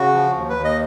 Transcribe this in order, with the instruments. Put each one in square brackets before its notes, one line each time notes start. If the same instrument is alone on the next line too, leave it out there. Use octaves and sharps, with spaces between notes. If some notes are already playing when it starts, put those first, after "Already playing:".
Already playing: [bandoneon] C#3 F#4
F3
D#2
B4
D#2
D#5